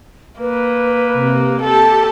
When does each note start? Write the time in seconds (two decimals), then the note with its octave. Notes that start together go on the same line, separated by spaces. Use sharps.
0.39 A#3 B4
1.13 C3
1.61 G4 A4 A5